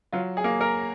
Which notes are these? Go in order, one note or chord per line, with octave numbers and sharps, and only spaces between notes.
F#3 F4
G#4
A#3
A#4